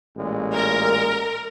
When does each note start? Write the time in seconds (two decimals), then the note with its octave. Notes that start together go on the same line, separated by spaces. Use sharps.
0.17 A1 A#2 G#3
0.54 A#4